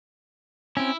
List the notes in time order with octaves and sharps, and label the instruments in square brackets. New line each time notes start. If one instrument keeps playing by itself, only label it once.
[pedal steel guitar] C4 C#4 [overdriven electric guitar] E4